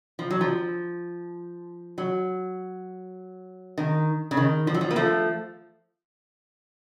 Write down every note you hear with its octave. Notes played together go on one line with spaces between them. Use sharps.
F3
F#3
F3
F#3
D#3
C#3
D#3
F3
F#3
F3
A#3
F3 A3